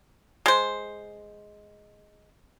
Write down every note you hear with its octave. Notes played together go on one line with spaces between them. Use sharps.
G#3 C5